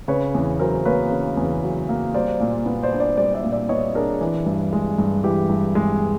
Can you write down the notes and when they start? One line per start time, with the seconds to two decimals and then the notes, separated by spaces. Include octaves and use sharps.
0.08 C#3 B4 C#5
0.34 E2
0.59 F#3 A#4 C5
0.85 A#3 B4 C#5
1.11 C#3
1.37 E2
1.63 F#3
1.89 A#3
2.14 G3 C5 D5
2.40 A#2
2.66 B3
2.83 C5 D5
2.92 D4
3.00 C5 D5
3.17 G3 C5 D5
3.34 D5 E5
3.44 A#2
3.52 D5 E5
3.69 B3 C#5 D#5
3.95 D4 G#4 A#4
4.21 E3
4.46 G2
4.73 G#3
4.98 G2
5.24 E3 G4
5.49 G2
5.75 G#3